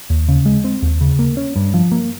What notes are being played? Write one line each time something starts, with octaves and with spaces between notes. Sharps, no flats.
D#2
C#3
G#3
C4
D#2
C#3
A#3
C#4
G2
F3
A#3